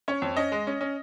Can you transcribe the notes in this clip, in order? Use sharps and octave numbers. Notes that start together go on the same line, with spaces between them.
C#4 C#5
F2
C#4 D#5
G#3
C#4
C#4